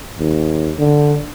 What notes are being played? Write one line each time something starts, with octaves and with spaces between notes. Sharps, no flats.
D#2
D3